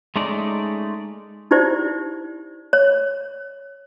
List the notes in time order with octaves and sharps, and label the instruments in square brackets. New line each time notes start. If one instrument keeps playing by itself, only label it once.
[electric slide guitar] G#3 A3 C#4 D#4 D5
[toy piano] D#4 E4 G4 C5 D5
C#5